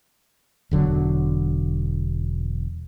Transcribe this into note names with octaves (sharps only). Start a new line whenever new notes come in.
E1 D3 F#3